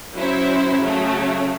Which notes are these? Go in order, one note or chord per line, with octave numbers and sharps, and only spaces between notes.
F#3 C#4 E4 C5
C#3 F#3 A3 C#4